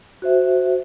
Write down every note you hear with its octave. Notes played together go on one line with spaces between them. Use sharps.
F#4 C5 E5